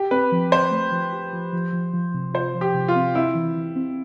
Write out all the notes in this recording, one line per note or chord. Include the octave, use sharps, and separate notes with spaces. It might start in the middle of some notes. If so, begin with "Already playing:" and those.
Already playing: G4
C4 B4
F3
C4 C5
A3
F3
G4
F3
F3
F3
F3
C3
F4 C5
F3
G4
C3
F4
C4
C4 E4
E3
E3
C4